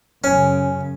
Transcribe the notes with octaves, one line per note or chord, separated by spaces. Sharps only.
F#2 C#3 C#4 C#5 G#5